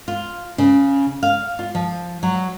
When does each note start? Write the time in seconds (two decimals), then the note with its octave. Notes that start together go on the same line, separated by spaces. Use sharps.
0.08 F4
0.58 C#3
1.23 F5
1.59 F4
1.75 F3
2.23 F#3